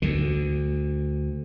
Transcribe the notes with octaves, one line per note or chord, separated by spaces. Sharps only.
D2 D3